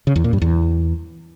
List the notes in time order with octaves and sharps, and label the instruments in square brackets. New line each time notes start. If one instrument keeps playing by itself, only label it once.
[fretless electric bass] C#3
E2
A#2
G2
E2